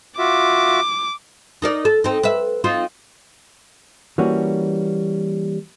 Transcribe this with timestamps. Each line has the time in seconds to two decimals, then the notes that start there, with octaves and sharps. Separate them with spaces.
0.18 F4 F#4 E5 D6
1.62 D#4 A#4 D5
1.85 A4
2.04 C4 D#4
2.23 B4 E5
2.64 C4 D#4 F4
4.18 E3 G3 A#3 C#4 F#4